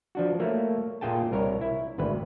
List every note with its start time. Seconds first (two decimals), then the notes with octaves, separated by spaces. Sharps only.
0.15 F3 D4 F#4
0.40 A3 A#3 C#5
1.01 A#2 F4 G#4 G5 A5
1.31 C2 A#4 C#5
1.61 E4
1.98 G#1 D2 B4